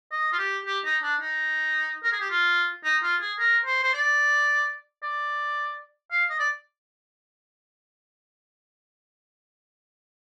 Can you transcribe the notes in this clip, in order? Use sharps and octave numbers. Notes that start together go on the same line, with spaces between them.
D#5
F4
G4
G4
D#4
D4
D#4
A#4
G#4
G4
F4
D#4
F4
G#4
A#4
C5
C5
D5
D5
F5
D#5
D5